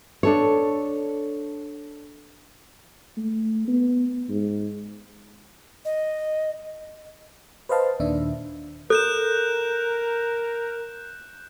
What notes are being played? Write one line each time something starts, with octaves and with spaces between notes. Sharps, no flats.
D4 A4 C#5
A3
B3
G#2
D#5
B4 C5 D#5 F5 A5
D#2 A#2 D#3 D4 E5
A4 A#4 F#6 G6 E7